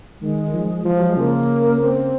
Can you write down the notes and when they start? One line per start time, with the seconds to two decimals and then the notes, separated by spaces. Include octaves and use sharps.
0.21 D#3 G#3
0.54 F3
0.84 F3
0.97 F#3
1.08 G#3
1.16 C#3 A#3
1.80 C4